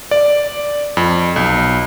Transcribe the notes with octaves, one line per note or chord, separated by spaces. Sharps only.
D5
F2
B1